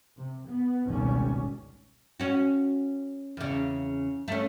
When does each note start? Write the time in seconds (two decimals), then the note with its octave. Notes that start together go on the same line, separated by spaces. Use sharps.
0.17 C3
0.47 B3
0.87 G#1 C#2 B2 G3 C#4
2.20 C#4 F#4
3.37 E2 C#3
4.28 A3 C#4